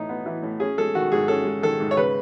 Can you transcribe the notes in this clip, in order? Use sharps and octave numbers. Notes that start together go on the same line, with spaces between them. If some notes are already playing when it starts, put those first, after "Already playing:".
Already playing: A2 E3 D#4
B3
E3
A2
C#4 G#4
G#3 A4
D#3 F#4
G#2 G#4
C#4 A4
G#3
D#3 A4
G#2
C#5
C#3 B4